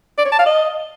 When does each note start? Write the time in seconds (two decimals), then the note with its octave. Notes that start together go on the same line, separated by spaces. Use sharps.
0.18 D5
0.25 C#5
0.32 A5
0.39 F5
0.46 D#5